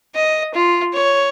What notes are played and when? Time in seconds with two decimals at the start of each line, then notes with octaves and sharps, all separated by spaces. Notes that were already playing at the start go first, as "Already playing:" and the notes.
0.15 D#5
0.54 F4
0.94 C#5